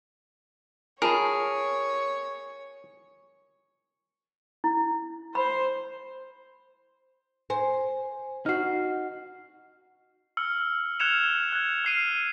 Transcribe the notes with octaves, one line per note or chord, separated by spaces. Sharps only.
F4 G#4 A#4 C#5 A5 B5
E4
C5 B5
C5 G#5
D#4 F#4 F6 C7
E6 F6 C#7
F6 F#6 G#6 C#7 E7 F7
F#6 G#6
F6 C7 D#7